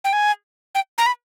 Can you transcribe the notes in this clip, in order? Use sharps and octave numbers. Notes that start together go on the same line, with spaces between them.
G5
G#5
G5
A#5
B5